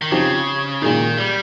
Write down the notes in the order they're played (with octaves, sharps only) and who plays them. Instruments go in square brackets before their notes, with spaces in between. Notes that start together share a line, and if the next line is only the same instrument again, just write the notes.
[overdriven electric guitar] D#3
[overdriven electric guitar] C#3 [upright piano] F3 C4 D#4 G4
[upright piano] A#2 G#3 D#4 [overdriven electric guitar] D#3
[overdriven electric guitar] G3